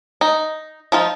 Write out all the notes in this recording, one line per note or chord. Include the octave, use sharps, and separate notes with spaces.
D#4
F3 D#4 F4